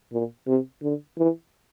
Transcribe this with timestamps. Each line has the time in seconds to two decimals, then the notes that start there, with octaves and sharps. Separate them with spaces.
0.12 A#2
0.47 C3
0.82 D3
1.18 E3